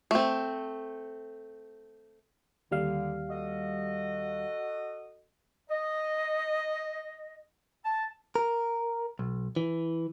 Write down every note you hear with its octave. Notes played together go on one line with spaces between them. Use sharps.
A3 C4
D#2 D3 G3 F5
F#4 A4 D#5
D#5
A5
A#4
B1
E3